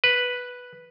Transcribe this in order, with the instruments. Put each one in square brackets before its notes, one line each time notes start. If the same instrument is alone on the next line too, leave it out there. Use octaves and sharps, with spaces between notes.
[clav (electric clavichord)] B4